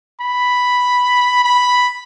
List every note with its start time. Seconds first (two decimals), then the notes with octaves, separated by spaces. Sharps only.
0.21 B5
1.44 B5